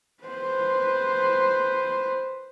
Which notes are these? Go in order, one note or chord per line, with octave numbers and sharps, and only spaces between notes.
B4 C5